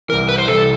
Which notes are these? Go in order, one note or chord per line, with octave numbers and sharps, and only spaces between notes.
C2 C3 E3 A#4
B4
C5
C2 C3 E3 A4